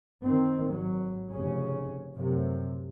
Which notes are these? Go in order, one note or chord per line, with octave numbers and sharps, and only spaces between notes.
D#3 C4
G#1 F#3
F1 C#3 C#4
F#2 A2 C3